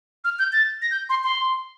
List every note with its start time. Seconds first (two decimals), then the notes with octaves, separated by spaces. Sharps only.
0.24 F6
0.39 G6
0.53 A6
0.82 A#6
0.91 G6
1.09 C6
1.23 C6